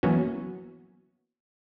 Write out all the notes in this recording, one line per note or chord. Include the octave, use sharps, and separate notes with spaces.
E3 F#3 A#3 B3 C#4 F#4